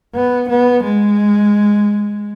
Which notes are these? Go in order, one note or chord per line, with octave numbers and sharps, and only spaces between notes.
B3
B3
G#3